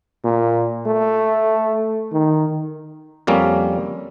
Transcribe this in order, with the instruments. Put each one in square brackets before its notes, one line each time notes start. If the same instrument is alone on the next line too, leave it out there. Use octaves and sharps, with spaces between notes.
[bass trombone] A#2
A3
D#3
[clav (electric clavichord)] F2 G3 A#3 C#4